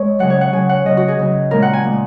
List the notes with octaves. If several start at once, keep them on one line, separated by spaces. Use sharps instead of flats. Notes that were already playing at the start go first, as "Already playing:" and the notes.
Already playing: G#3 A#4 C#5
C#3 F#3 F#5
C#5
F#5
C#3 F#3 G#5
F#5
C#3 F#3 D#5
F#4
G#4
C#3 F#3
A#2 G#3 A#4
F#5
G#5
A#2 G#3